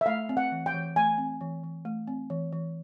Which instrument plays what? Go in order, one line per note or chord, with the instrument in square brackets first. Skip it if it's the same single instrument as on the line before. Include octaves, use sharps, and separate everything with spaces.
[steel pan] E5
[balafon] A3 [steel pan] F5
[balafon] C4
[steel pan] F#5
[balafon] E3
[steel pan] G5
[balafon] E3
[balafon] A3 [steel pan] G#5
[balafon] C4
E3
E3
A3
C4
E3
E3